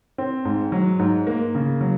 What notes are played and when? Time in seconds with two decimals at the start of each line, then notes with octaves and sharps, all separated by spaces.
0.18 C4
0.45 G#2
0.72 F#3
0.99 G#2
1.27 A#3
1.55 C#3
1.81 F#3